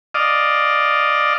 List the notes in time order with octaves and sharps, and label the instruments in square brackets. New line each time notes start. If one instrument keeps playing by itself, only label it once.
[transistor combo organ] D5 D#5 F5